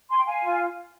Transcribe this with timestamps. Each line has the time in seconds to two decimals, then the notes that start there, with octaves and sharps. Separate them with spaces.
0.10 G#5 C6
0.18 G5
0.26 F5 G#5
0.43 F4